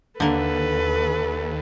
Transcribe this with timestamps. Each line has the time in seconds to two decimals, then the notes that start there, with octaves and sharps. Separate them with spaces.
0.20 D#2 D3 A#3 A4 B4